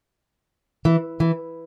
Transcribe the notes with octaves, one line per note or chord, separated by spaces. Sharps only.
E3
E3